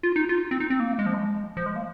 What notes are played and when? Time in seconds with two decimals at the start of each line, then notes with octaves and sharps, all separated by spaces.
0.03 F4
0.16 D#4
0.29 F4
0.51 C4
0.60 D#4
0.70 C4
0.80 A#3
0.99 G#3
1.06 F3
1.14 G#3
1.57 F3
1.66 G#3
1.76 A#3